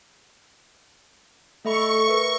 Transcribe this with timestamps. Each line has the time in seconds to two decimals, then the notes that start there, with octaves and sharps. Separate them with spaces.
1.65 A3 A4 E5 B5 C#6
2.08 A#4 B4 E5